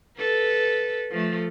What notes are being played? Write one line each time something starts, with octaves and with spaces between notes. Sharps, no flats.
A4 B4
F3 A3